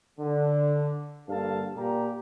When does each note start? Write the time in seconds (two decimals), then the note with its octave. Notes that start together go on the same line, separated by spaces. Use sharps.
0.19 D3
1.28 G2 D3 A#3 A4 F5 A5
1.77 A#2 G4 A#5